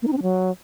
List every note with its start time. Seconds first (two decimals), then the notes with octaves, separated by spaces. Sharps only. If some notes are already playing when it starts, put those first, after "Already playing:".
0.02 A#3
0.07 D#4
0.12 C4
0.17 D4
0.22 F#3